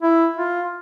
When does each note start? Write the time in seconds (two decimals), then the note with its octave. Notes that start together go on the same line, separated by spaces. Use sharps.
0.02 E4
0.37 F4